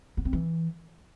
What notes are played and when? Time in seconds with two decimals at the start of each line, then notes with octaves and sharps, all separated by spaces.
0.17 B3
0.25 C4
0.33 E3